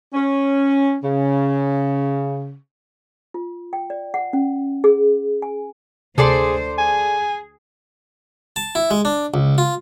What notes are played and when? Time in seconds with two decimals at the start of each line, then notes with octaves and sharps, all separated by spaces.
0.14 C#4
1.04 C#3
3.34 F4
3.73 G5
3.90 D5
4.14 F#5
4.33 C#4
4.84 G#4
5.42 G#5
6.18 D2 C3 G#4 A4 C5 D5 C6
6.78 G#4 G#5
8.56 A5
8.75 E4
8.91 G#3
9.05 D4
9.34 C#2
9.58 F4